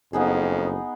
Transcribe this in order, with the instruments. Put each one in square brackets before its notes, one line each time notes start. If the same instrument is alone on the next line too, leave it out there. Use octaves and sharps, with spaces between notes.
[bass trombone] F#1 [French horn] F2 [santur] B3 D#4 G#4